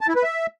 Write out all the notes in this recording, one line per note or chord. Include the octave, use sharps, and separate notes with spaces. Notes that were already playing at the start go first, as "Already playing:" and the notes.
A5
E4
B4
E5